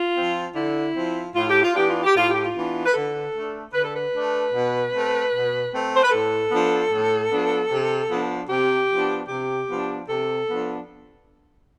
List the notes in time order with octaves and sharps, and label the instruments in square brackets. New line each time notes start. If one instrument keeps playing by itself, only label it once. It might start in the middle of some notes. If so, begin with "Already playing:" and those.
Already playing: [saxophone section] F4
F3 C4
D3 E4
F3 C4
A2 F4
G4
F4
E3 B3 D4 G4
F4
G4
A2 F4
G4
F4
E3 B3 D4
B4
D3 A4
A3 D4
D3 B4
A4
B4
A3 D4
B2
A3 C4
B2
A3 C4
C5
B4
A2 A4
F3 B3 D4
A2
F3 B3 D4
C3
F3 B3 D4
C3 G4
F3 B3 D4
C3 G4
F3 B3 D4
C3 A4
F3 B3 D4